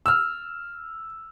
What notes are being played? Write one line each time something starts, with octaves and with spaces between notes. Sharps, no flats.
E6 F6